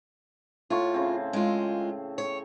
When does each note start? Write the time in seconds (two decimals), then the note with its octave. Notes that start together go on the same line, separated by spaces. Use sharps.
0.70 A2 F4 C#6
0.94 C#3 C4
1.33 G#3 F4
2.18 C#5